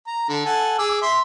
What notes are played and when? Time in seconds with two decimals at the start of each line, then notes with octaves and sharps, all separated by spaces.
0.07 A#5
0.29 D3
0.45 A4 F#5 G#5
0.79 G#4 D6 E6
1.02 E5 C6